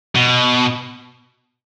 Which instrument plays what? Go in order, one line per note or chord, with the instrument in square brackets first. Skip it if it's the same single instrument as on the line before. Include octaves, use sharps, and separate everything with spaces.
[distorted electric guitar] B2